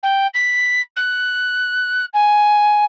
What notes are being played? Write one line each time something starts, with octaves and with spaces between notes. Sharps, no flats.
G5
B6
F#6
G#5